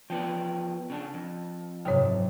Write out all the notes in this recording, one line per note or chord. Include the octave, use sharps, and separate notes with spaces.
F3 B3 D5 G5
C#3 D4
F2
F#1 G#2 C3 C#5 G5